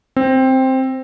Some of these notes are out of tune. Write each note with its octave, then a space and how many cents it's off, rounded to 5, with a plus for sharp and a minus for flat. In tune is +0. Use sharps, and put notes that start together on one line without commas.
C4 +5